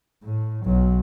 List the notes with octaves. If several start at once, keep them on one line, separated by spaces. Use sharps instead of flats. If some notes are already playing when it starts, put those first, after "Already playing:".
A2
B1 F#3